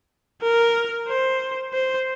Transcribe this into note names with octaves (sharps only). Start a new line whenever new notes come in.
A#4
C5
C5